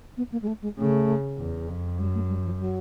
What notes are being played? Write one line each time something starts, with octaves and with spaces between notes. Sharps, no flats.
B3
A#3
G#3
A3
G#3
C#3 A3
E2
F2
F#2 G3
A3
G3
F3
F#3